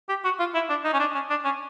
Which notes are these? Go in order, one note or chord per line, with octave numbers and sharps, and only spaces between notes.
G4
F#4
F4
E4
D4
D#4
C#4
D4
C#4
D4
C#4